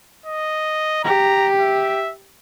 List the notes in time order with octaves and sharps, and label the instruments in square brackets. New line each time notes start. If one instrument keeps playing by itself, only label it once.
[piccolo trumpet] D#5
[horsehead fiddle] G4 [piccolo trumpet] A#5
[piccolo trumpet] E5